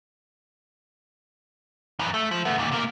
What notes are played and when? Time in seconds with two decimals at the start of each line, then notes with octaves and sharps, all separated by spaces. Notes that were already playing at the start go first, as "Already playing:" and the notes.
2.00 F#2 E3
2.14 A3
2.31 F3
2.45 A3 B3
2.58 D#2 A#2
2.72 C3 A#3